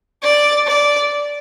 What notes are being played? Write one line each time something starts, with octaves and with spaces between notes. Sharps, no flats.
D5
D5